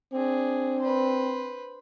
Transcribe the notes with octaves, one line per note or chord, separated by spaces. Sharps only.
C4 D4 G#4
B4 C5